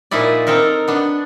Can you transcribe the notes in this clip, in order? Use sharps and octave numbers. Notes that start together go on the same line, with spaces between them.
A#2 F3 D#4 E4 D5
C4 D#4 A4 A#4
B3 D4